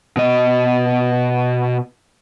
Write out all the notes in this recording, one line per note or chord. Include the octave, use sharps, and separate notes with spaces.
B2 D#5